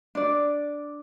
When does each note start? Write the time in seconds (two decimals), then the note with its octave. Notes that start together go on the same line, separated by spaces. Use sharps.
0.15 D4 D5